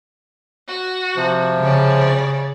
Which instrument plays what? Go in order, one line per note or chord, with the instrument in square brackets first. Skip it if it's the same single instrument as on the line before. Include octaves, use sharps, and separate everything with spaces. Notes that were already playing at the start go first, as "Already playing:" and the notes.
[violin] F#4
[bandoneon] C3 F3
[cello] C#3 [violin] C#5 D5